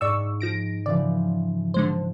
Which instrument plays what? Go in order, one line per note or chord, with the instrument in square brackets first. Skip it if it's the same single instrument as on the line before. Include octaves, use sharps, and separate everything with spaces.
[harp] G#2 [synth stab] D5 C#6 E6
[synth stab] F3 A#6 D7
[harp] C#3 E3 F3 [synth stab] D5
[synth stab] D3 G#3 C5